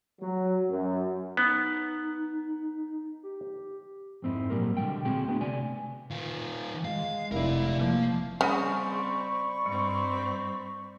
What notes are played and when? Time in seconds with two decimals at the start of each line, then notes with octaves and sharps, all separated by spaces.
0.21 F#3
0.70 F#2
1.37 B3 D#4
3.23 G4
4.22 F2 G#2 C4 D#4 E4
4.50 A#2 F#3 G3 A#3 A#4
4.77 B2 D3 G#3 G5
5.05 D2 A#2 C4 F#4 G#4 G5
5.28 A3 B3 D4
5.41 C3 A3 D5 G#5
6.10 D#3 F4
6.85 G#3 F5
7.32 F1 E4 A#4 D5
7.79 F3 A#3
8.41 C#3 G3 C4 G#4 D5 B5 C#6
9.66 G2 G3 C4